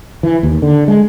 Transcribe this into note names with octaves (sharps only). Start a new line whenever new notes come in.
E3
D#2
D3
G#3